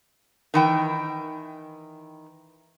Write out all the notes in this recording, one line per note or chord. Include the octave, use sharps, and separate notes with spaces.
D#3 E3 G5